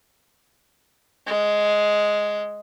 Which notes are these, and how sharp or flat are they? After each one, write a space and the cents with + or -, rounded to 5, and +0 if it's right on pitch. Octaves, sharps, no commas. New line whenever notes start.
G#3 +5